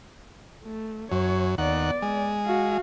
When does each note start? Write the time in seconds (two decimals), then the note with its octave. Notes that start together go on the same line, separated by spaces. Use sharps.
0.63 A3
1.12 F#2 C#5
1.58 D#2 B3 D5 F#5
2.02 G#3
2.45 F#4 F5